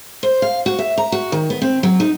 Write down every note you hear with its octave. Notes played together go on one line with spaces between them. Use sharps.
C5
F5
F#4
E5
A#5
F#4
D#3
B3
C4
F#3
D#4